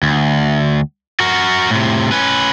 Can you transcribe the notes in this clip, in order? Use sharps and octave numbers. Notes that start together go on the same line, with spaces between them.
D2
F#4 A#4
A2 C3
C#4 B4